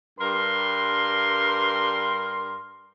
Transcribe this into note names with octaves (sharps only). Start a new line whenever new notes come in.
G2 A#4 C6